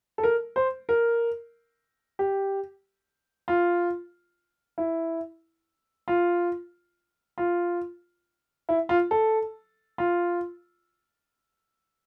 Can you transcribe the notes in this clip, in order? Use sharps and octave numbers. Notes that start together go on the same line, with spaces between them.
A4
A#4
C5
A#4
G4
F4
E4
F4
F4
E4
F4
A4
F4